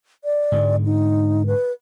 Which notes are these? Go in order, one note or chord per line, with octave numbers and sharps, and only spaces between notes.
D5
G#2 D3 G#3
D#4
B4